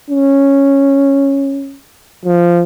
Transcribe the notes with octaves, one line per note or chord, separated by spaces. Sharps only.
C#4
F3